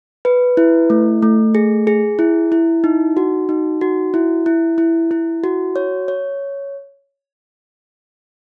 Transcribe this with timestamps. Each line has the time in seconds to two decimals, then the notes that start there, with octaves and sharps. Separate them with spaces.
0.25 B4
0.57 E4
0.90 A3
1.22 A3
1.55 G#4
1.87 G#4
2.19 E4
2.52 E4
2.84 D#4
3.17 F#4
3.49 D#4
3.81 F#4
4.14 E4
4.46 E4
4.78 E4
5.11 E4
5.44 F#4
5.76 C#5
6.08 C#5